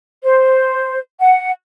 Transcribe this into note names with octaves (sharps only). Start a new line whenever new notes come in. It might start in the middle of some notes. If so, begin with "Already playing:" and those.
C5
F#5